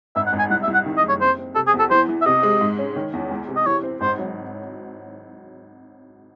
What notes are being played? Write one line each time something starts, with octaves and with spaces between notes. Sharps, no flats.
G#1 E5
F#5
G#1
G#5
C2 F#5
E5
C2
F#5
D#3
D#5
F#1
C#5
C4 C5
C4
C3 A4
G#4
E2
A4
E3 C5
E3
E5
C3 D#5
G#3
G#2
C#4
D#3
E2
C#2
C3
D#5
E3 C#5
C4
G#1 C5
F#3